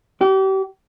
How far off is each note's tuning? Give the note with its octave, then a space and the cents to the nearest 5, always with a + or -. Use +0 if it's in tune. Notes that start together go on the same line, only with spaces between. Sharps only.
G4 -35